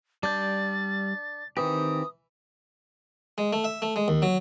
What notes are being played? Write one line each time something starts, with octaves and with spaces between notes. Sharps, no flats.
G3 D4 D5 G6 A6
D#3 E3 C4 G4 D#6
G#3
A3
E5
A3
G#3
D#2
F#3